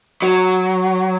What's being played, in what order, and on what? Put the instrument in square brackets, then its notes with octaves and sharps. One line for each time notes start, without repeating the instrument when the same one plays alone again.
[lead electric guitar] F#3